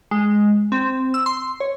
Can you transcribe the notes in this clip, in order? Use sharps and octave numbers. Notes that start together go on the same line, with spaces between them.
G#3
C4
E6
C6
C#5